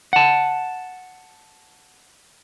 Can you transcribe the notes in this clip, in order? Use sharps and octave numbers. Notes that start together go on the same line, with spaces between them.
F#5 A5